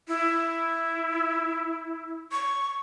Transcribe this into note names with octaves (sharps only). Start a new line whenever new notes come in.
E4
C#6